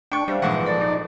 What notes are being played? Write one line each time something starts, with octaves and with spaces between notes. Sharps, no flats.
D4 G5 C#6
G3 D4 C5 E5 F5
A#1 G#2 E3 F#3 B4 F#5
A4 D5 A5 B5
D#4